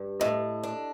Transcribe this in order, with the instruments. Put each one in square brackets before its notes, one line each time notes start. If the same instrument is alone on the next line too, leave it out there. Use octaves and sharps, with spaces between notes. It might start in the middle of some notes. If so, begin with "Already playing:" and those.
Already playing: [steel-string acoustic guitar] G2
[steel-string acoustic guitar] A2 [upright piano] D#5
[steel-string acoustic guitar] D4